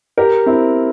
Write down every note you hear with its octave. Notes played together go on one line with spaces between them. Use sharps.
G4 A#4
C4 E4